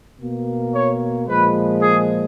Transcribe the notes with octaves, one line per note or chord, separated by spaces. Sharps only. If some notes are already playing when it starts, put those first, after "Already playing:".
B2 A#3
C#5
A#2 F3 G#3 B4
G#4